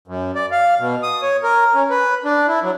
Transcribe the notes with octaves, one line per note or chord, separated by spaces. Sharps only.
F#2
D5
F5
B2
D#6
C#5
A#4
C#4
B4
D4
E4
F#3